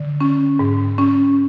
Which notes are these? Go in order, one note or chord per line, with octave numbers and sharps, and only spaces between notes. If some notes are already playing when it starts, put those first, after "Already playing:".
Already playing: D3
C#4
G#2
C#4